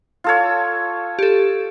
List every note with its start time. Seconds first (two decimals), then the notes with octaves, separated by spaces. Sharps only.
0.24 F4 A4 C#5
1.19 G4 A4